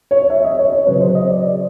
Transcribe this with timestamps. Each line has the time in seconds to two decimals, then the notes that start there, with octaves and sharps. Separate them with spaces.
0.11 C#5
0.30 E5
0.44 D#5
0.59 C#5
0.72 C#5
0.87 C#3 F#3 B4
1.00 C5
1.15 D#5
1.29 D5
1.43 D5